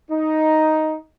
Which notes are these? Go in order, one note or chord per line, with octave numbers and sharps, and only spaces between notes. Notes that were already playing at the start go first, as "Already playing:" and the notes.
D#4